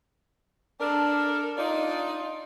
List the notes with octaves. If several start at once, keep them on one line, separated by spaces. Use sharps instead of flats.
D4 A4 A#4
D4 D#4 F4 D5